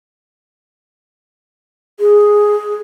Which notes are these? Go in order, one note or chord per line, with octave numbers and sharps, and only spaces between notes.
G#4